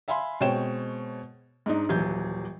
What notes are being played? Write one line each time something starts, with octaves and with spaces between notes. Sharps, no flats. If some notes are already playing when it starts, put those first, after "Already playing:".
E5 F5 G#5 B5 C6
B2 G#3 C4 C#5 G5 E7
G#2 D4 D#4
D#1 E3 F#3 G6